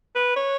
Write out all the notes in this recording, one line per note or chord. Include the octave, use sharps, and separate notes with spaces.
B4
C#5